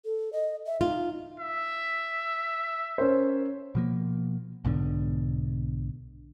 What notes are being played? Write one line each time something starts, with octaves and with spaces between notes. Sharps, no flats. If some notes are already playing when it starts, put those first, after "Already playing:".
A4
D#5
E5
D#4 F4
E5
C#4 A#4 C5
B2 F3 A#3
B1 G#2 B2 D3